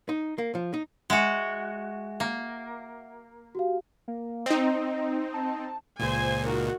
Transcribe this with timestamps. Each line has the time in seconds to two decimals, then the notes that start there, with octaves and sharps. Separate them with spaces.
0.09 D#4
0.38 A#3
0.55 F3
0.74 D#4
1.10 G#3 F#4 E5 F#5
2.20 A#3
3.55 F#4 G4 F5
4.08 A#3
4.46 C4 D#4 D#5
5.34 A5
5.99 C#2 A#2 C5 G#5
6.44 D#3 F#4 A#4